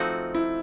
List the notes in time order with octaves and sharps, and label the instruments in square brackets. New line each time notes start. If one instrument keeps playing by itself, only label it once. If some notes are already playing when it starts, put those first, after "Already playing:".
Already playing: [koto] F3 A3 C4 D#4 F#4 [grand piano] F4
[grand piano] E4